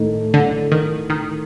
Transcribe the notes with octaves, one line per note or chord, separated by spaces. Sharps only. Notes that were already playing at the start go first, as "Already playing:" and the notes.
Already playing: A2 D#3 A3 D#4
D3
D#3
D#3